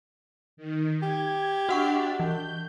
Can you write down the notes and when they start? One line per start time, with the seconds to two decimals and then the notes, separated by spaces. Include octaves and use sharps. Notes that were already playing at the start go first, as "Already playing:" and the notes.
0.57 D#3
1.02 G4 G#6
1.69 D4 F#4 F#5 C#6
2.20 E3 G6